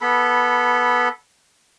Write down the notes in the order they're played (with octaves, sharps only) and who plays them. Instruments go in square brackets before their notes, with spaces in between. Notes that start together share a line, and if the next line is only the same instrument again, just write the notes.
[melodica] B3 A4 B5